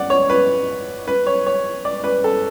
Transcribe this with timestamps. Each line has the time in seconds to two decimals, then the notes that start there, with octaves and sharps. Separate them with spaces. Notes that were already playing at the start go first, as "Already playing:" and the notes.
Already playing: D5 F#5
0.10 C#5
0.30 B4
1.07 B4
1.26 C#5
1.47 C#5
1.85 D5
2.04 B4
2.24 A4